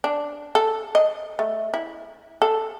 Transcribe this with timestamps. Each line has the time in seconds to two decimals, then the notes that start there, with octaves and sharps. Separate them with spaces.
0.04 D4
0.55 A4
0.95 D#5
1.39 A3
1.74 E4
2.42 A4